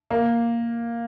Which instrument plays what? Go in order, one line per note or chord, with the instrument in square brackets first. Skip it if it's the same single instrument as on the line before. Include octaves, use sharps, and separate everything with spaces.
[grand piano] A#3